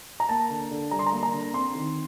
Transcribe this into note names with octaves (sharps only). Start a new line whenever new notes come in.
A#5
A#3 A5
D3
D3
G3 A#5
C6
A#5
A#3
A#5
D3
C4 C6
D#3